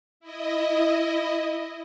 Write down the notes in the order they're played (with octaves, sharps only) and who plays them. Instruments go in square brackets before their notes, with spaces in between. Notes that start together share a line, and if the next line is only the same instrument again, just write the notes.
[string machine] E4 D#5